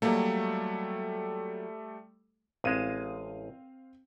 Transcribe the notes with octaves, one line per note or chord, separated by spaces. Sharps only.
F#3 G3 A3 A#3
A1 G#3 C4 F5 D#7